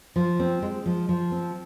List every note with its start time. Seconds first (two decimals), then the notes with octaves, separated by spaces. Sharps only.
0.16 F3
0.40 C4
0.62 G#3
0.86 F3
1.09 F3
1.32 C4